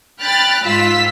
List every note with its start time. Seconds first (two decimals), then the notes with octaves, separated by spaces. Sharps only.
0.20 G5 B5 F6 F#6 A6
0.64 G#2 F4 E6 B6